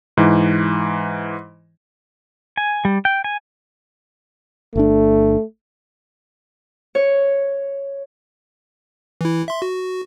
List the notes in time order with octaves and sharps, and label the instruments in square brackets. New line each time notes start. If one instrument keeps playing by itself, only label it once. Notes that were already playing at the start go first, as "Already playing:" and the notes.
[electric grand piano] G#2 E3
[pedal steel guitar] G#5
G3
G5
G#5
[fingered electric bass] G1 D4 [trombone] A3
[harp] C#5
[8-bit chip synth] E3 E4
E5 C6
F#4